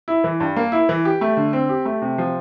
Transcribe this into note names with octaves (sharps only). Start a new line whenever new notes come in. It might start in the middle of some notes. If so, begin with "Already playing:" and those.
E4
E3
G2
A#3
E4
E3
G4
A3
D3
C4
G4
A3
C3
F3